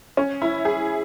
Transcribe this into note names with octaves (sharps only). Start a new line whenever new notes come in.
C#4
E4
G#4